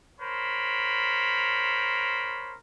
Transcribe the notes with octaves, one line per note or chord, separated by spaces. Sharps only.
A#4 C5 C#5 B5